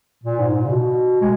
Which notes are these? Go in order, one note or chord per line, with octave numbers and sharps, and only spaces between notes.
A#2
G#2
A#2
C#3
B2
G#3